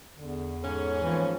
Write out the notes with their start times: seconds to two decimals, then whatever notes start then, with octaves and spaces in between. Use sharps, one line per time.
0.17 E2 D3
0.63 G#2 C#4 A4
1.03 E3 F3 A#3